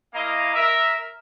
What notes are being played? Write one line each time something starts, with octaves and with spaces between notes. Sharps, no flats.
A#3 E4 D#5 F5 A#5
A#4 E5